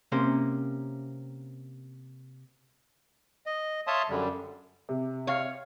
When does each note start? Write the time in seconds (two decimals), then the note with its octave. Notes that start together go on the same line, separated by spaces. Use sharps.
0.12 C3 A#3 C#4 C5
3.46 D#5
3.87 C#5 E5 F5 A5 C6 D#6
4.09 F#2 D3 G3
4.89 C3
5.27 C#5 F5